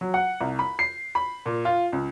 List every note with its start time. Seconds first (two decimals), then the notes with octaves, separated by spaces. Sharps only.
0.01 F#3
0.14 F#5
0.41 C2
0.59 B5
0.79 C7
1.15 B5
1.46 A#2
1.65 F4
1.93 C#2